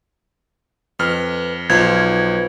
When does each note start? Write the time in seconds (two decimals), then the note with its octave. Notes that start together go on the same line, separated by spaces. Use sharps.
0.99 F2 B4 F6
1.70 B1 F3 F4 B4 G#6